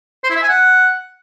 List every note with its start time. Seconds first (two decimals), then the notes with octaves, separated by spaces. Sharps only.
0.24 C5
0.30 E4
0.36 E5
0.43 G#5
0.49 F#5